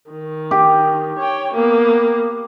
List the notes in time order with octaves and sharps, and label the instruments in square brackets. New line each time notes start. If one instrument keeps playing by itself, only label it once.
[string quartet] D#3
[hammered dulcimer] G4
[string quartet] C#5 G5
A#3 B3